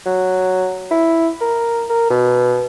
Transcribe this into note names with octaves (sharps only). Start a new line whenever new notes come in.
F#3
E4
A#4
A#4
B2